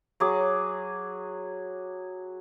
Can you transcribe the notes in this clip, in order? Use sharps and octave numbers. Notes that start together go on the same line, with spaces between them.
F#3 G#4 D6